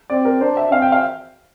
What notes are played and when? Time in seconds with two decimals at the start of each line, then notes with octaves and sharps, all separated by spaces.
0.10 C4 D5
0.25 A#4
0.41 D4 C5
0.57 E5
0.72 C4 F5
0.82 G5
0.92 F5